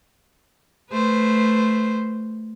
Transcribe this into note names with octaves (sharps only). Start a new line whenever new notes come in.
A3 B4 C5